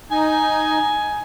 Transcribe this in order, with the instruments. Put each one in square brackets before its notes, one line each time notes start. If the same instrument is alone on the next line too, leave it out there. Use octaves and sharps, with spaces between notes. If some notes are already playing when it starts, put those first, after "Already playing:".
[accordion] D#4 [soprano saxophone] G#5